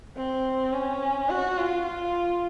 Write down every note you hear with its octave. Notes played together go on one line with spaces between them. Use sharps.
C4
C#4
F#4
F4
F4